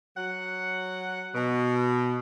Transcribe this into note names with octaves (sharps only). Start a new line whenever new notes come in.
F#3 F#5
B2